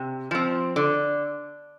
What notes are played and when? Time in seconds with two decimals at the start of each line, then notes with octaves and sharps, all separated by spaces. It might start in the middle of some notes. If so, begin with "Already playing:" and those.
Already playing: C3
0.31 F3 C4
0.76 D3